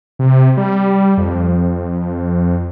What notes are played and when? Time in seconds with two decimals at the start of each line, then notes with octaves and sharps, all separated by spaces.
0.19 C3
0.57 G3
1.18 F2